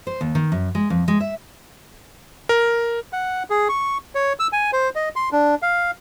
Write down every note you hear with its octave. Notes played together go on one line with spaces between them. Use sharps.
C5
D#2
D#3
F#2
G#3
F2
G#3
E5
A#4
F#5
G#4
C#6
C#5
E6
G#5
C5
D#5
C6
D4
F5